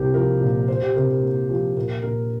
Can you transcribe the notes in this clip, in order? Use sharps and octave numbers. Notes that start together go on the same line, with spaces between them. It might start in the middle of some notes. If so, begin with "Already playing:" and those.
Already playing: C2 C4 G4 A#4
F3 A#4
A#2
F4 C5
G4
C3 A#4
A#4
A#3
F3 G4
A#2 A#4
A#2 A#4